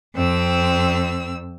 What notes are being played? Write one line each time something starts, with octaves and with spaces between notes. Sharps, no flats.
F2 C4 E6